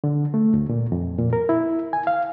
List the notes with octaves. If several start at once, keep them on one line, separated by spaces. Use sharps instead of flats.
D3
A3
D2
A#2
F2
A#2
A#4
E4
G#5
F5